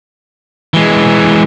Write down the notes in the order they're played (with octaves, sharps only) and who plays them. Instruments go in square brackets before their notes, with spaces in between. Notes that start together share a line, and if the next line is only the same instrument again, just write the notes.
[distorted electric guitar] E3 G#3